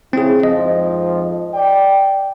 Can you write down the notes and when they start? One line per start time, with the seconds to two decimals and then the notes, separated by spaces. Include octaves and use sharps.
0.13 C#3 C4 E4 G#4
0.43 F2 G#2 F3 D#5
1.54 D5 G5